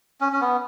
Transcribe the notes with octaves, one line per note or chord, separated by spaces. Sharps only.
C#4
C#4
B3